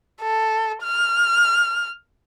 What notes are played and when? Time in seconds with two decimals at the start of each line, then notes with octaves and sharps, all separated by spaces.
0.21 A4
0.83 F6